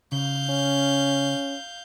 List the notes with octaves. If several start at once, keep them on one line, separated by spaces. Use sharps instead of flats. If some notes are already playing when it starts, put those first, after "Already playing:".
C#3 F5 G6
C#4